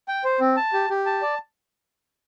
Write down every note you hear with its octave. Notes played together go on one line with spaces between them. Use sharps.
G5
C5
C4
A5
G4
G4
A5
D5